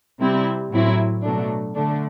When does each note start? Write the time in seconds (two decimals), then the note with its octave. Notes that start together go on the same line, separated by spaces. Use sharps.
0.20 C3 G3 C4 E4
0.72 A2 F#3 C4 E4
1.23 B2 F#3 A3 D4
1.75 D3 A3 D4